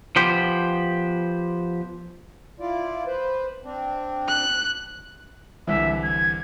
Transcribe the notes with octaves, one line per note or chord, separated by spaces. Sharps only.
F3 B3 G4 C5
E4 F4 D5
B4 C5
C4 D4
F#6
C2 D3 E3 E5
G#6